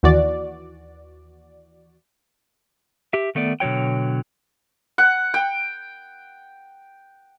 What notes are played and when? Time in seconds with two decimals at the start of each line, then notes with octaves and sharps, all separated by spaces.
0.03 D#2 E3 F#4 D5
3.13 G4 E5
3.35 D#3 A3 B3 D5
3.60 B2 D3 F#3 C#5 G5
4.98 F#5
5.34 G5